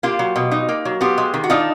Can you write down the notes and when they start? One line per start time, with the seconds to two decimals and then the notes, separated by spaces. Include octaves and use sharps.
0.03 A#3 F4 G4
0.19 F#3
0.36 B2
0.51 D#4
0.69 A#3
0.85 F#3
1.01 B3 F4 G4
1.18 G#3
1.34 D#3
1.44 F#4
1.50 D4 D#4 F4